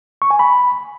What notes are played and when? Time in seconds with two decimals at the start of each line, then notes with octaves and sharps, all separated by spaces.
0.22 C#6
0.31 G#5
0.39 B5